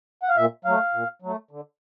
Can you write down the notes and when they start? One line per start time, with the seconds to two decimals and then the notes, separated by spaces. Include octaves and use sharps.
0.23 F#5
0.29 F5
0.36 A#2 E5
0.65 F#3 A3 F5
0.94 A#2
1.22 F#3 A3
1.51 D3